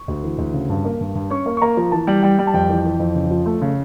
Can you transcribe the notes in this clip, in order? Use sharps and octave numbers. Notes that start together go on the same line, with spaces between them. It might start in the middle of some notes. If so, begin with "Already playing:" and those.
Already playing: C#6
D2
E3
D2
C#3
G2
A#3
G2
G2
C#4 C#6
A#3
C#6
A#3 A#5
F3
E3 A5
G3
G3 G5
G3
A5
F2 G5
E3
E3
F2
C#3
F3
A3
C#3